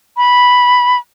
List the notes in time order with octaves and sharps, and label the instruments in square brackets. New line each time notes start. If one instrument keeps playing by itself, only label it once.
[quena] B5